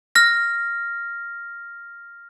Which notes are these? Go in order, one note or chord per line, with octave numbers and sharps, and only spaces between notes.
F6 A#6